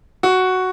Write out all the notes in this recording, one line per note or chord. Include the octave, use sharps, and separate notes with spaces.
F#4